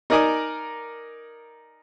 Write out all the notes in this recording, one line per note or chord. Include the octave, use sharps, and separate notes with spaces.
D#4 A#4 D5 D#5 G#5 D6